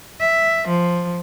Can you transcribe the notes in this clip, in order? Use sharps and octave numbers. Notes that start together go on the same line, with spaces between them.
E5
F3